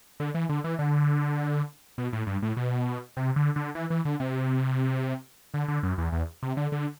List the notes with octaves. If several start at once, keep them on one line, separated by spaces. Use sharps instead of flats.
D3
E3
D3
E3
D3
B2
A2
G2
A2
B2
C3
D3
D3
E3
E3
D3
C3
D3
D3
F#2
E2
E2
C3
D3
D3